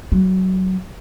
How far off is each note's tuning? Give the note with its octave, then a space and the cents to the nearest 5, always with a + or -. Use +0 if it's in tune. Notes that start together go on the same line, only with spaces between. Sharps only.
F#3 +15